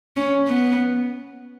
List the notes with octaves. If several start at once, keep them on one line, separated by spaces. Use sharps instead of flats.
C#4
B3